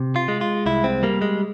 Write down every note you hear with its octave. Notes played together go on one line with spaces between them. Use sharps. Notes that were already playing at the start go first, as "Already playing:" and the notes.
Already playing: C3
F4
G#3
F4
C2 E4
C4
G3 A#3
G#3